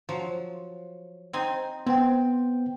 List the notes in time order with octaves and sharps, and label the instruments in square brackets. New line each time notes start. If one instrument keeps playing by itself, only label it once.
[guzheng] F3 F#3
C4 D#4 G#5
[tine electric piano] B3 G5 [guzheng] C4